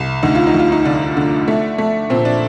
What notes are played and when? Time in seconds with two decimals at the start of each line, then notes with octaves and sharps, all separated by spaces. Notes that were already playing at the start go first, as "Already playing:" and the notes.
Already playing: C2
0.23 D2 D#4
0.35 F4
0.47 D#4
0.54 D2
0.59 F4
0.72 D#4
0.85 D3 D4
1.17 D3
1.48 A3
1.78 A3
2.10 A#2 C4
2.25 D4